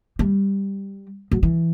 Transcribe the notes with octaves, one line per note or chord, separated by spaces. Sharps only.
G3
F#3
E3